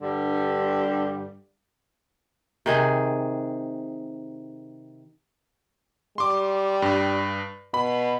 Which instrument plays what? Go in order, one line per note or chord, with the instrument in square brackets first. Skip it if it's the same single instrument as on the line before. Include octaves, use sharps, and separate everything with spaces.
[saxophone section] G2 D3 G3
[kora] C3 D#3 G#4
[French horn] G3 [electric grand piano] C6 D6
[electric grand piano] G2
[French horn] B2 [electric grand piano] B5